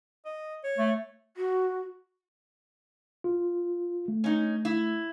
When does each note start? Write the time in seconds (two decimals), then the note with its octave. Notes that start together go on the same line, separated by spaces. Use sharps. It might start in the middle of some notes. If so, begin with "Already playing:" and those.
0.25 D#5
0.64 C#5
0.78 A3
1.37 F#4
3.24 F4
4.08 A3
4.24 C#4 D#4
4.65 E4